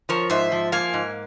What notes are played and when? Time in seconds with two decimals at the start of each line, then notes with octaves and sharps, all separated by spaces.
0.09 F3 A#4 C#5
0.30 G#2 C5 E5
0.52 F3
0.72 A#3 F5 G#5
0.94 G#2